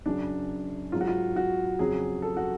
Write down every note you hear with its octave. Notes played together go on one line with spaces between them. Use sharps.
F#2 C#3 F#3 D4
G#2 F#3 F4
F#4
F4
F#4
F2 C#3 F#3 G#4
A4
F#4